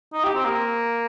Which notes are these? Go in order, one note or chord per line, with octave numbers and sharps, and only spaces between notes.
D#4
G4
C4
A#3